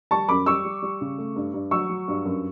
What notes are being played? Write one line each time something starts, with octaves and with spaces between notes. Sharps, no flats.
G3 A5 C#6
F#2 B5 D6
G3 C#6 E6
G3
G3
C#3
A3
G2
G2
F#3 C#6 E6
F#3
G2
F#2